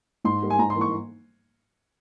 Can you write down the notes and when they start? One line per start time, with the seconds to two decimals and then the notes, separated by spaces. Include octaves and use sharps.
0.24 G#2 C6
0.42 G3 A#3
0.50 G#5
0.59 G#2 A#5
0.70 C6
0.76 E3 A#3
0.81 C#6